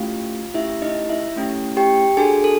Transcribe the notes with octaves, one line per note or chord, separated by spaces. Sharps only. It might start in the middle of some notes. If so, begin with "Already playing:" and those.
Already playing: A3 C#4 E4 F4 G4 F5
A3 C#4 E4 G4 E5
D#4 D#5
E4 E5
A3 C#4 E4 G4
G4 G5
D4 F#4 G#4 A4 G#5
A4